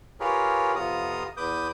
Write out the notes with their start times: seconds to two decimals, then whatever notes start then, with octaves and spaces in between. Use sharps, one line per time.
0.20 F4 G4 G#4 A#4 B4 C#5
0.76 F2 C3 B3 F4 A#5 D#6
1.37 E2 B4 D6 D#6 G6